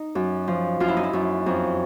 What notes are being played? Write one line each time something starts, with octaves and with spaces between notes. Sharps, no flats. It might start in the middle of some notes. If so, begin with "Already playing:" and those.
Already playing: D#4
F#2
F3
F#2 F4
E4
D#4
E4
F#2
F2